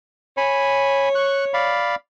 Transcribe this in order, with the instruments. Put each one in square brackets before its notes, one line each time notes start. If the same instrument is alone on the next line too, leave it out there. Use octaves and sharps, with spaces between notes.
[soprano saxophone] C#5 [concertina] G#5 B5
[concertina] C#6 F#6
D5 F5 B5